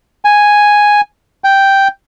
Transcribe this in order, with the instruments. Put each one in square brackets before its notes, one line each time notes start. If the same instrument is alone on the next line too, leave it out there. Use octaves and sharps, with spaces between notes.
[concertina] G#5
G5